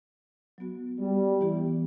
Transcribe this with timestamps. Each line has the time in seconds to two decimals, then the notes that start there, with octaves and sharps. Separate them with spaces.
0.58 F#3 B3 F#4
0.99 G3
1.41 E3 B3 E4 G4